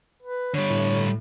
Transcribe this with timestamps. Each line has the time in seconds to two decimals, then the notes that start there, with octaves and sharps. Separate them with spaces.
0.23 B4
0.54 D3 G3 C#5
0.70 A2